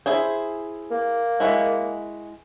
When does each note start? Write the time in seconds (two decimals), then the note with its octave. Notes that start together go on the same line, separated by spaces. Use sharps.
0.06 E4 G#4 C5
0.91 A#3
1.40 G#3 E4 F#4